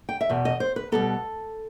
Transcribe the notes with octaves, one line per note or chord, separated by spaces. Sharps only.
G5
E5
E2 B2
D#5
C5
B4
B2 G3 B3 A4